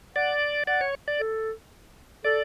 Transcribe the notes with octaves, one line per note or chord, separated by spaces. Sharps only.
D5 F#5
D5 F#5
C#5
D5
A4
A4 D5